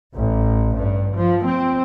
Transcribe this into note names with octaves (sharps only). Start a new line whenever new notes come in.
A1
G2
F3
C4